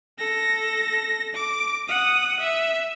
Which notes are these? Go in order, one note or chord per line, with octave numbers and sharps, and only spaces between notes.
A4 A#6
D6
F#5 D#6
E5